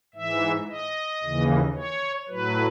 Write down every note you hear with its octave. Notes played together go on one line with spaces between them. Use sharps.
G#2 E3 E5
D#5
D#2 C#3 E3
C#5
A2 F#3 B4